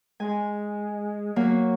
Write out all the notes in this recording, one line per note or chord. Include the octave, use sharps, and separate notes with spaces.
G#3 G#5
F#3 A#3